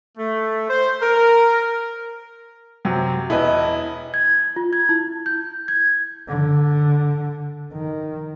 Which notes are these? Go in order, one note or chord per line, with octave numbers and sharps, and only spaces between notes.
A3
C5
A#4
F#2 C3 F#3
E1 E4 B4 D#5
G#6
F4
G#6
E4
G6
G#6
D3
D#3